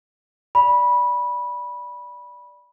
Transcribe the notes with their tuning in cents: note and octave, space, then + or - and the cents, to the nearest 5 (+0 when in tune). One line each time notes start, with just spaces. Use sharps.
D5 +0 B5 -15